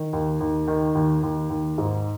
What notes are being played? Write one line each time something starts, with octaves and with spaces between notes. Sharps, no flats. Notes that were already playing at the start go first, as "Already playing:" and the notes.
Already playing: D#3
D#2
D#2
D#3
D#2
D#2
D#2
G#2